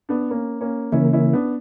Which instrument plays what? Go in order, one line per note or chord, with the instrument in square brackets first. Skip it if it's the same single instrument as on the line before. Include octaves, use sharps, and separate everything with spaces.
[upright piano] B3 D4
A#3 C#4
A#3 C#4
[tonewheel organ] C#3 E3 A#3 [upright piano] C#4 E4
[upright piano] C#4 E4
B3 D4